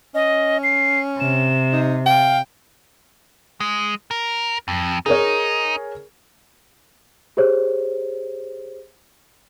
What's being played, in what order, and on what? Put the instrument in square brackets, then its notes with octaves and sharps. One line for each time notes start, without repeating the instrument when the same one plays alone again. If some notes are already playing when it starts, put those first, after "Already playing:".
[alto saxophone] C#4 [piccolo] D#5
[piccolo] C7
[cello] C3 [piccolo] E7
[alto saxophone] D#4
[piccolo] F5 [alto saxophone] G5
[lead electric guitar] G#3
A#4
F2
[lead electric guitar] D#4 [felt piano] G#4 A#4 C#5
[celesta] G4 G#4 C5 C#5